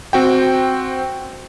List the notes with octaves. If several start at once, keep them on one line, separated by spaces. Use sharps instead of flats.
C4 F#4 G5